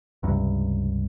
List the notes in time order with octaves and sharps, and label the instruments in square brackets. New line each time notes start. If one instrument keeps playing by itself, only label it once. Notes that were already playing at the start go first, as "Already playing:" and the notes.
[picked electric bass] C#2 G2 C3